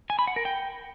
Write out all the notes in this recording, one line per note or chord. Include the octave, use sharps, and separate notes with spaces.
G#5
B5
F#5
A#4
G5